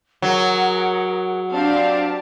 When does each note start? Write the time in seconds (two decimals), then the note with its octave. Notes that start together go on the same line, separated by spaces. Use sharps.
0.22 F#3 G#4 A#4 F#5
1.52 C4 D4 G4 D5 F5 A5